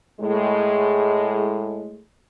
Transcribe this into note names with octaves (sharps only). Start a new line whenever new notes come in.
A2 G#3